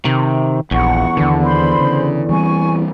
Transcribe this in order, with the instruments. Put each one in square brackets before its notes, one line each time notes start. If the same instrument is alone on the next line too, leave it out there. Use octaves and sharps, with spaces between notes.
[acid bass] C3 [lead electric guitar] D#3
[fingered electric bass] D#1 [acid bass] A#1 [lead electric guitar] E2 [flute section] F#5 C#6
[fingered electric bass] D#2 E3 [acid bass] D3
[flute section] C5 B5 C6
[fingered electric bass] C#3
[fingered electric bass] E3 G3 C4 [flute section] G#5 C#6